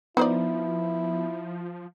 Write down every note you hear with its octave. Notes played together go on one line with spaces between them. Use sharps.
F3 B3 D#4 E4 C5 D5